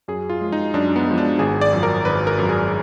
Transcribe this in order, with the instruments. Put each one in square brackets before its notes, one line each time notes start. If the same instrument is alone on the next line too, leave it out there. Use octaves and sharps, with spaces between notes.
[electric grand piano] F#2 G#4
F4
F3 G#3
D#4
F#2 D4
B3
F3 G#3
D4
G#1 G#4
D5
F#2 F3
A#4
G#1 B4
A#4
F#2 F3
G#4